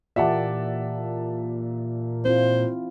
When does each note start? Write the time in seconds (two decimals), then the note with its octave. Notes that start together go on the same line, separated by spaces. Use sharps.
0.16 A#2 E3 G4 D5 E5 F#5 A5
2.25 C4 E4 F4 C5